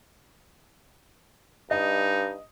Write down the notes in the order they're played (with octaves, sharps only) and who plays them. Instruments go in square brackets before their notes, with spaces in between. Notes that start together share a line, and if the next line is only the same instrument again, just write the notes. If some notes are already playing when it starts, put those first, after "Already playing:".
[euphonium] G2 [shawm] D#4 [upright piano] D#5